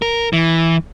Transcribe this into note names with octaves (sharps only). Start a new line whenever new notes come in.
A#4
E3